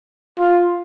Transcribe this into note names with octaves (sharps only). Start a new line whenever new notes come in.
F4